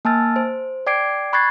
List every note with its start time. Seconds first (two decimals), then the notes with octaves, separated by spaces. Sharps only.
0.05 A#3 G#5 A5 E6 F6 A6
0.36 C5
0.87 D5 G5 D6 G#6 C7 D7
1.33 B5 C#6 F#6 G#6 A6 C7